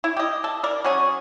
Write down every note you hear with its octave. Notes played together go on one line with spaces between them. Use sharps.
E4
G4 D#5
A4
A#4 D5
F#3 C#4 G#4